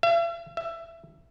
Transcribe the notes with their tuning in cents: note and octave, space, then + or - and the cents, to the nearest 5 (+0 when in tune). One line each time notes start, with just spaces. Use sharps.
E5 +45
E5 +20